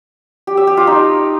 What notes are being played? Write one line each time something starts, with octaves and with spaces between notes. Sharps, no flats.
G4
E5
G4
F4
D#4